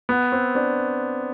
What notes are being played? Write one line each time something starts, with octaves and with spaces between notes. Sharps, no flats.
B3
C4
C4 D4